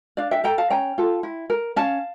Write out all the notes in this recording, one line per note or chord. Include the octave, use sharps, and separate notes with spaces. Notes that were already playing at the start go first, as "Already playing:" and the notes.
D4 D5 F5
E5 G5
A4 G5 A#5
F5 A5
C#4 G5 A#5
F4 A4
E4
A#4
C#4 F5 A5